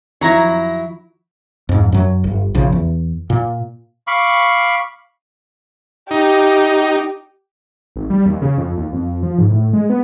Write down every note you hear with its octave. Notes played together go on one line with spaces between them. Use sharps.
F2 D#3 F3 F#3 E4 A#5 A#6
F2 G#2
F#2 F#3
G1
A#1 C#3 F3
E2
A#2
F5 B5 C#6 D6
D#4 G4
G#1
G3
D#2
C#3
F2
D#2
F2
F3
G#2
A2
G#3
B3